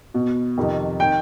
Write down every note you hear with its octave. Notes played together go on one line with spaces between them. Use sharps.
B2
F2 C3 D#3
D#3 G5